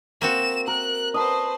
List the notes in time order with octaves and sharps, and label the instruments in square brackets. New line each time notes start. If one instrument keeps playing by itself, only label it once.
[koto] A#3 C4 F#4 [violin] E7
[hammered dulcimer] A#4 [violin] F#6
[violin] B4 C5 [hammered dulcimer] D#5 A5 C#6